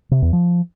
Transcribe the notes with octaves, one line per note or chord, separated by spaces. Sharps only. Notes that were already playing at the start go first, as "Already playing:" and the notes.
C3
E2
F3